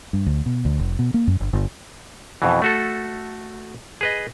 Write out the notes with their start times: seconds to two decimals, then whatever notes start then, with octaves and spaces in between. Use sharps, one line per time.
0.13 G2
0.26 D2
0.46 B2
0.65 D2
0.79 F1
0.99 B2
1.14 A#3
1.27 F#2
1.40 G1
1.53 G1
2.42 F2 B2 E3
2.62 A3 F#4 A4
4.01 G#4 B4 D#5